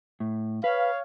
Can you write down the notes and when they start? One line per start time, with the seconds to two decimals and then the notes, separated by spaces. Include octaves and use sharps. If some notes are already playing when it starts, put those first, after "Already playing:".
0.20 A2
0.64 B4 C#5 F5